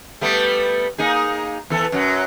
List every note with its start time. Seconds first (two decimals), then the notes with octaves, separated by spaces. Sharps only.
0.21 G3 A3 B3
0.98 A#3 D#4 G#4
1.70 E2 E3 A4
1.92 F#2 F#3